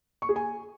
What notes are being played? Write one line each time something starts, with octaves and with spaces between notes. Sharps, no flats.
C#6
G#4
G#5